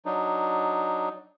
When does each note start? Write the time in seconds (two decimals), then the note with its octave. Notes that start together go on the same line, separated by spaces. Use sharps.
0.06 F#3 D4 D#4